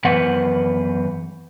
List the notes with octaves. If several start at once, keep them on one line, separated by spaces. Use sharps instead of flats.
F#2 E3 B3 B4 C5 F#5